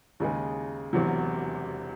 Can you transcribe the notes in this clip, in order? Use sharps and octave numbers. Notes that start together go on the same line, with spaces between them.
D#2 C#3 G#3 D#4 G#4
E1 E2 C3 F#3